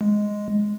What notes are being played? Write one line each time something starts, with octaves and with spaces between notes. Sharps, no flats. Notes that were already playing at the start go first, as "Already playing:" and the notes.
G#3